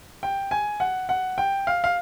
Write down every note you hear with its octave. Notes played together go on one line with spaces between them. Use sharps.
G5
G#5
F#5
F#5
G5
F5
F5